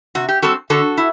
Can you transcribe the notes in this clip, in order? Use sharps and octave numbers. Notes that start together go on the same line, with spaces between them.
C3 F#4
G4
G3 C4 F#4 A4
D3 F#4 A4
E4